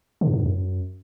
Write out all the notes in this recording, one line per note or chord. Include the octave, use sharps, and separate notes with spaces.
D3
G2
G#2
F2
F#2